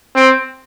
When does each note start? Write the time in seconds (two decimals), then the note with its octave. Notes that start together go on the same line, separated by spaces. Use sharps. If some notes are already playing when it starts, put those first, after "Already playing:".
0.16 C4